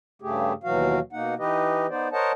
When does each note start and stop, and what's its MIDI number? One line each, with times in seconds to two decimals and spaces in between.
0.22 0.53 43
0.22 0.53 49
0.22 0.53 57
0.22 0.53 67
0.22 0.53 68
0.64 0.99 39
0.64 0.99 47
0.64 0.99 52
0.64 0.99 54
0.64 0.99 66
0.64 0.99 77
1.13 1.34 47
1.13 1.34 58
1.13 1.34 63
1.13 1.34 78
1.38 1.87 52
1.38 1.87 63
1.38 1.87 67
1.38 1.87 71
1.38 1.87 75
1.90 2.08 59
1.90 2.08 63
1.90 2.08 72
1.90 2.08 74
2.13 2.32 70
2.13 2.32 72
2.13 2.32 73
2.13 2.32 75
2.13 2.32 78
2.13 2.32 81